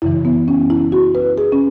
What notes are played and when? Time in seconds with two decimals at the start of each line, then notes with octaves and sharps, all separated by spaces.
0.02 F#2 C#3 E3 E4
0.25 B3
0.48 C#4
0.70 E4
0.92 F#4
1.15 B4
1.38 G#4
1.52 C#4